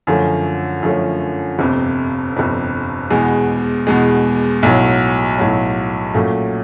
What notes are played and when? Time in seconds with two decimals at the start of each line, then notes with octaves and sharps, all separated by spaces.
0.07 F#2 D3 F3 A3 C#4
0.83 F#2 D3 F3 A3 C#4
1.59 G1 F2 C3
2.34 G1 F2 C3
3.10 E2 B2 G#3
3.87 E2 B2 G#3
4.63 B1 A2 F#3
5.38 B1 A2 F#3
6.15 A#2 F#3 A3 C#4